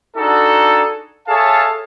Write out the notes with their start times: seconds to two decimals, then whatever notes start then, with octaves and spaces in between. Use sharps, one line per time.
0.17 D4 D#4 F#4 G#4 A4
1.28 G#4 A4 C#5 E5 F5 A5